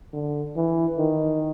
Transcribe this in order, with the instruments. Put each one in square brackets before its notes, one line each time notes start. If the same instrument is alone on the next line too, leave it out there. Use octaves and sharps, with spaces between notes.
[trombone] D3
E3
D#3